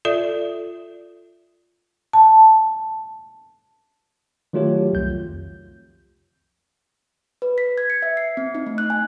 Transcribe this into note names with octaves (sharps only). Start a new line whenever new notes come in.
F4 A4 D5 E5
A5
D#3 F#3 A3 F4 G4 C#5
C2 F2 G6
B4
B6
G#6
C#7
E5
C7
C4
D#4
A3
F#6
G#5